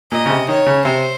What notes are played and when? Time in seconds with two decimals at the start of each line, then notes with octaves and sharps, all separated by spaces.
0.12 A#2 D#5
0.26 C#3
0.30 C3
0.48 D#3 C#5
0.66 C#3
0.85 C3 C5